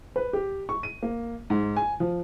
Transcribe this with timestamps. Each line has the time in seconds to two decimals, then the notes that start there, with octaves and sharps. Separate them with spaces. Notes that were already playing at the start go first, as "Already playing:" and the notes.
0.16 B4
0.33 G4
0.69 C#6
0.83 D#7
1.03 A#3
1.50 G#2
1.76 G#5
2.00 F3